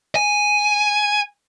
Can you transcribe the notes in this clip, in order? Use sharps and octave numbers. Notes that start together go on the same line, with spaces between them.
G#5